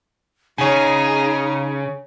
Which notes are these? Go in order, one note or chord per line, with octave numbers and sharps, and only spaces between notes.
C#3 D#4 G#4 C#5 G#5 A#5